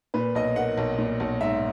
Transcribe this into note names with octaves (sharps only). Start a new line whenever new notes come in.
A#2 B4
B1 D#5
A#3 F#5
B1
A#2
B1
G#2 E5